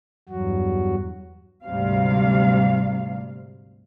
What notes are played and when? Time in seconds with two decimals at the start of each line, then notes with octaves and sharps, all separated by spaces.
0.29 E2 G2 F#3 F#4
1.64 D2 G#2 C3 G3 F5